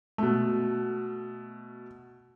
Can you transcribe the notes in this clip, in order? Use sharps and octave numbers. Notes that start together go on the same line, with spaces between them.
B2 A3